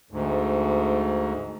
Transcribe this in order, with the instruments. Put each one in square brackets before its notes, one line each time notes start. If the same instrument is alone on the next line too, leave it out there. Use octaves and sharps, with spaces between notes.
[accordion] D2 G#2